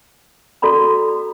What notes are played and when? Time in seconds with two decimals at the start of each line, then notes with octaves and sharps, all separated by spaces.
0.62 F#4 A4 D5 A#5 B5